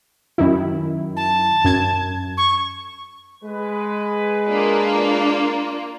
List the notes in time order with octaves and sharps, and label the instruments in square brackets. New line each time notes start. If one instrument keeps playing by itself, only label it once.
[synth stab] F#2 D#3 E4
[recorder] A5
[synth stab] F#2 G#6
[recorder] C#6
[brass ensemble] G#3 B4
[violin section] A#3 D4 F4